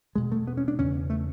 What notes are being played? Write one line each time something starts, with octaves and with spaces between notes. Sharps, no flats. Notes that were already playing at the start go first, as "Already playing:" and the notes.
E2 B2 G#3
A3
B3
C#4
D4
E2 C#3 C#4
A3